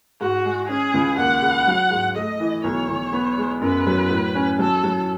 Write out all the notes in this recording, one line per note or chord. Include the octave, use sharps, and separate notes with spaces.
G#2 F#4
G#3
C#4 G#4
C#2
D#2 F#5
C#3
F#3
G#2
A3 D#5
E3
B1 C#5
B1
B3
G#3
F#2 B4
F#3
A2
C#4
F#3 A4
F#3